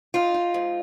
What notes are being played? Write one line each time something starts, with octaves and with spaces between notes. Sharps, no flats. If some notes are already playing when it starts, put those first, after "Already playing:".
D#4 F4
D#4
G#2